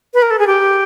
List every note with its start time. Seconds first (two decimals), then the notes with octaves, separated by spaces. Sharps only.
0.14 B4
0.22 A#4
0.31 A4
0.39 G#4
0.47 G4